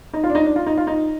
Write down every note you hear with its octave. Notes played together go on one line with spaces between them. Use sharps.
D#4
F4
D4
D#4
D4
F4
D#4
F4
D#4